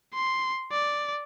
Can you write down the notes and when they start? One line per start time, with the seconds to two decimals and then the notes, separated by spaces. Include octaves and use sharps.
0.14 C6
0.72 D5